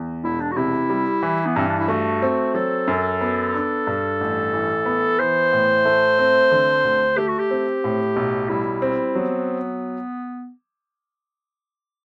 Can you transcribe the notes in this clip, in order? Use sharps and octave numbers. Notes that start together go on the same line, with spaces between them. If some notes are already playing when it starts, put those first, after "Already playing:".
Already playing: E2
E1 E4
D4
F#4
C3 E4
G3
E3
B3
G2 C4
D4
E4
A3 F#4
C4
F#3 A4
F#2
B3
D4
G2
A1
E3
B3
E3 C5
A2
A3
C4
D3
D2
A3 G4
F#4
G4
C4
A2
B1
G3 E4
C4
F#3 B3